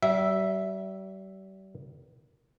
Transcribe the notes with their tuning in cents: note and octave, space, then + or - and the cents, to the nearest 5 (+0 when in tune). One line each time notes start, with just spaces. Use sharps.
G3 -40 E5 +0